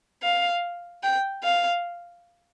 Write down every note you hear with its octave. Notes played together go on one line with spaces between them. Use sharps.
F5
G5
F5